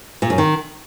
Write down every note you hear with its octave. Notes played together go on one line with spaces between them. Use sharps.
A#2
F#2
D#3